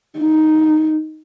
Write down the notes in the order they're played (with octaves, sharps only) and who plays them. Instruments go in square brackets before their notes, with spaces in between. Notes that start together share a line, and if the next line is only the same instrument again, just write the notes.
[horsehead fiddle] D#4